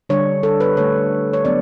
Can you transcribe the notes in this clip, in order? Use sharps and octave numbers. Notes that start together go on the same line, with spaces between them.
D3 G3 D4 C#5
A4
B4
D3 A3 D4 C#5
C#5
F#3 B3 D4 D5